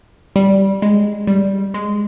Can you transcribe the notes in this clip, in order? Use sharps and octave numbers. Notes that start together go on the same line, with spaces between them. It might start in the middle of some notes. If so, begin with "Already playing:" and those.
G3
G#3
G3
G#3